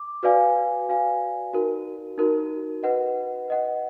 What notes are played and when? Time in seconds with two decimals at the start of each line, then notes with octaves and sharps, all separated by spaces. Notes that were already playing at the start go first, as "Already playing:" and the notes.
Already playing: D6
0.23 F#4 B4 D5 F5 G#5
0.89 F#4 B4 D5 F5 G#5
1.53 D#4 F#4 A#4
2.18 D#4 F#4 A#4
2.83 B4 D#5 F#5
3.48 B4 D#5 F#5